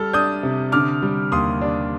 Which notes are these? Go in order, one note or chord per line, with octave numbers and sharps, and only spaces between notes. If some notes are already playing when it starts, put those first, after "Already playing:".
Already playing: G3 A4 F6
D4 D#6 G6
C3
D3 D6 F6
G3
D#2 C6 D#6
D4